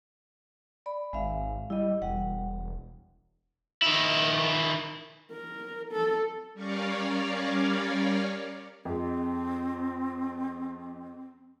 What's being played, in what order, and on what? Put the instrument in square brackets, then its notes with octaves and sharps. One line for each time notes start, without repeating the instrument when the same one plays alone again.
[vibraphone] D5 B5
[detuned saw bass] G#1 [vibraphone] G#3 E5 F5
[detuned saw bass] G3 [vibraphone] E4 D#5
[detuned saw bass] E1 [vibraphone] G3 F#5
[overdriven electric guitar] D#3 E4
[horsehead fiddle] A#4
A4
[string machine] G3 C#4 A#4 C#5 D5 F5
[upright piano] F2 G#3 [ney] C4